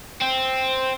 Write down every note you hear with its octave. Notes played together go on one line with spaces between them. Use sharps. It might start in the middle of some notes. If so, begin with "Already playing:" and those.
C4